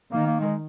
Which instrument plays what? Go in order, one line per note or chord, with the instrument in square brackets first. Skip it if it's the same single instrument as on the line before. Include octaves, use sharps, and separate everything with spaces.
[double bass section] D#3 [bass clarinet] A#3
[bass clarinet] A#3
G#3